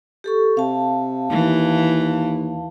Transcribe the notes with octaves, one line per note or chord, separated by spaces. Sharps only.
G4 A4 C#6
C3 F5 A5
D#2 E3